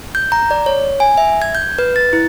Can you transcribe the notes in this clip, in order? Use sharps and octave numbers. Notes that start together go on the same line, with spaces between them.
G6
A#5
D5
C#5
G#5
E5
G#6
G6
B4
A6
E4